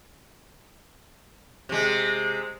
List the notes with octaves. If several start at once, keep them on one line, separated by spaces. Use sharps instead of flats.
C3 G#3